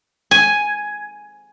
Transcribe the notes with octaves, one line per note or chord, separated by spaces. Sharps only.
G#5